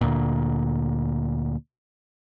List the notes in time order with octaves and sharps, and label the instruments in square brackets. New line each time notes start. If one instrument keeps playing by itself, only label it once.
[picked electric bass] D2 A#2